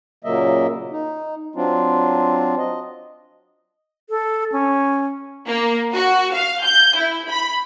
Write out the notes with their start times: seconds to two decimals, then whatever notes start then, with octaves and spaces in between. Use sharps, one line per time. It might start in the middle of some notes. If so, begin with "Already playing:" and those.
0.24 A#2 C#3 F#3 A#3 D#5 E5
0.92 D#4
1.55 F#3 C4 D4 F4
2.58 D#5
4.10 A4
4.52 C#4
5.47 A#3
5.93 F#4
6.33 F5
6.63 G6
6.96 E4
7.28 B5